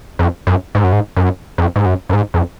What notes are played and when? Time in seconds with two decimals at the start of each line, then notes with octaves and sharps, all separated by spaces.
0.19 F2
0.47 F#2
0.75 G#2
0.84 F#2
0.92 G#2
1.17 F#2
1.58 F2
1.76 G#2
1.86 F#2
2.09 F#2
2.13 G#2
2.34 F2